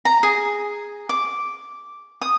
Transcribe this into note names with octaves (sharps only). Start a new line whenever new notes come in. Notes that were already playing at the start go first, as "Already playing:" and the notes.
A#5
G#4
D6
D#6